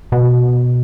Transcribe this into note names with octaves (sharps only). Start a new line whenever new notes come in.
B2